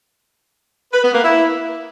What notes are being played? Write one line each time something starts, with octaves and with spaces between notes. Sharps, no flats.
B4
B3
A#3
E4